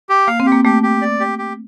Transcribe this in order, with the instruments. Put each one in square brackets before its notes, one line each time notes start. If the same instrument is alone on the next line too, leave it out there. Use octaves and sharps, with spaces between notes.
[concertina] G4
[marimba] A#3 [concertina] F5
[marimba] C4
[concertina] G4
[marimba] A#3
[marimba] A3 [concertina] G4
[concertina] G4
D5
G4
G4